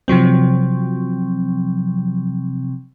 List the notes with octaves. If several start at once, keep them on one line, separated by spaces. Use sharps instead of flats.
C3 F3 F#3 C4